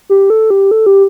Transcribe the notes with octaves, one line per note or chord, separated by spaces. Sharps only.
G4
A4
G4
A4
G4